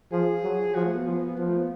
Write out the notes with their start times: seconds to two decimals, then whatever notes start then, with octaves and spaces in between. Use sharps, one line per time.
0.12 F3 G#4
0.43 F#3
0.75 F3 F#4
0.85 A3
0.95 B3
1.06 F3
1.37 F3 B3
1.48 A3
1.58 B3